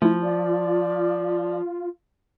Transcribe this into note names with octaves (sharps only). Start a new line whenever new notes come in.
F3 A3 E4
F4 D5